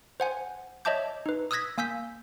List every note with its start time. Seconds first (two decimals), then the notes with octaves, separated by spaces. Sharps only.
0.20 C5 F#5 G#5
0.85 C#5 D#5 E5 A5 D6 G6
1.26 D#4 B4
1.51 D#6 E6 F#6 G#6 A#6 B6
1.78 A#3 G#5 E6 G6 B6